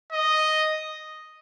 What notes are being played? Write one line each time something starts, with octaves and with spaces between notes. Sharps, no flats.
D#5